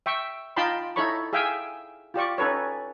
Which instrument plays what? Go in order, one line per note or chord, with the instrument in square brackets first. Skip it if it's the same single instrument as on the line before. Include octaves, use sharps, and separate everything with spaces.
[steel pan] E5 G5 C#6
D#4 F4 G5 A5 B5 C6
D#4 E4 A4 C#5 B5 C#6
G#4 E5 F5 G5 G#5
F4 G4 D5 C#6
C#4 D#4 A4 B4 C#5